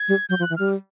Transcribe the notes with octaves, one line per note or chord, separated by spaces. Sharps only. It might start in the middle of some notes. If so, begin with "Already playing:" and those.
Already playing: G#6
G3
F#3 G6
F3
F#6
E3
G3 F6